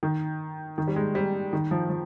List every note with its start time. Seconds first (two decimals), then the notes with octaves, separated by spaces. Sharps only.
0.03 D#3
0.78 D#3
0.87 G3
0.96 G#3
1.15 G3
1.53 D#3
1.71 F3
1.90 F3